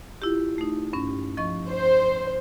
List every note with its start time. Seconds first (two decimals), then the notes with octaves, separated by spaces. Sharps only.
0.22 E4 F4 G4
0.58 A3 D#4
0.93 G2 C#4
1.37 F3 D#5 C#6
1.69 C5